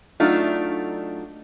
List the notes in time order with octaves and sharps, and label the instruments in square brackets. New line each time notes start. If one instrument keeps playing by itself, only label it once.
[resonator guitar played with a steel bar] F#3 A3 D4 D#4 F4